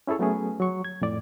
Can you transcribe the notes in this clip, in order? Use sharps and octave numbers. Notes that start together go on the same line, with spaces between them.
C#4 E4 G#4 A4 C#5
F#3 A3 B3 C#4 G#4
F#3 C#6
G#6
F2 A2 D5